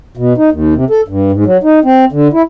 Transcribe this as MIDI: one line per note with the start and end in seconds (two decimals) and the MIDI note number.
0.17 0.33 47
0.38 0.50 63
0.52 0.74 39
0.75 0.85 48
0.90 1.01 69
1.08 1.31 43
1.32 1.44 44
1.46 1.57 54
1.63 1.79 63
1.84 2.05 60
2.12 2.28 50
2.33 2.42 64